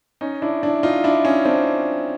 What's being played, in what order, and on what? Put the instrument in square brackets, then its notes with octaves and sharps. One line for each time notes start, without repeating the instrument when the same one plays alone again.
[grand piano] C#4 D#4
D4 E4
D4 E4
D#4 F4
D4 E4
C#4 D#4
C4 D4